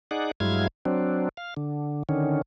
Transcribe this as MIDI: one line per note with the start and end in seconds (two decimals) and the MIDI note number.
0.11 0.31 63
0.11 0.31 68
0.11 0.31 74
0.11 0.31 78
0.40 0.67 43
0.40 0.67 54
0.40 0.67 56
0.40 0.67 64
0.40 0.67 77
0.40 0.67 92
0.85 1.29 54
0.85 1.29 60
0.85 1.29 62
1.37 1.54 77
1.57 2.03 50
2.09 2.42 50
2.09 2.42 51
2.09 2.42 61